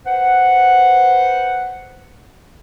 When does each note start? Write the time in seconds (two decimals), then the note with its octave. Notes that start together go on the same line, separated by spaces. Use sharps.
0.06 B4 C5 F#5